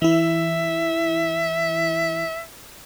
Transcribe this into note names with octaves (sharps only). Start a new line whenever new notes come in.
E3 E4 E5